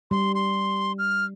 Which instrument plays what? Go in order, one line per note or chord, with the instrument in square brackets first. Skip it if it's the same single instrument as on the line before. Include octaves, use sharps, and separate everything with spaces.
[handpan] G3 [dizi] C6
[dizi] C6
F6